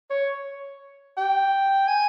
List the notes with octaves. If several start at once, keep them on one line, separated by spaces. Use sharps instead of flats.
C#5
G5
G#5